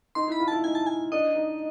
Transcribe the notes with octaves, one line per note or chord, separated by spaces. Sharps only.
D#4 C6
E4
B5
F4
E4 A5
D#4 G#5
A5
G#5
D4 D#5
D#4